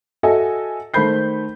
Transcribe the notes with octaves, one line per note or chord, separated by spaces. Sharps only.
F#4 A4 D#5 E5 G#5
D#3 A3 C5 B5 G6 C7